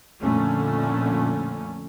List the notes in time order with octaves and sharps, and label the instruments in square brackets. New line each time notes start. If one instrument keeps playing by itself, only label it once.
[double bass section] F2 A#2 D3 A3 C#4